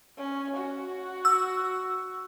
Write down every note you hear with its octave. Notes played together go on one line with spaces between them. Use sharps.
C#4
F#4
E6